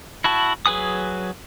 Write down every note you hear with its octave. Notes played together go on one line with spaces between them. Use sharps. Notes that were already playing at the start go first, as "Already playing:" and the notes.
E4 F#4 A5
F#3 G#4 B4 G#5 D#6